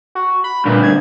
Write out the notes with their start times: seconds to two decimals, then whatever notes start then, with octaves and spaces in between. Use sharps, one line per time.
0.15 F#4
0.44 B5
0.66 D2 G2 A#2
0.83 G#6